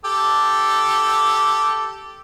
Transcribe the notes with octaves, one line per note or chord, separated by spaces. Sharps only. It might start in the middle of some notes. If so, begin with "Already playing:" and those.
G4 A4